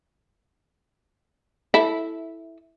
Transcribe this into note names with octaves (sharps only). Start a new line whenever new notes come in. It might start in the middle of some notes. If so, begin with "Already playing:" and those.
E4 A4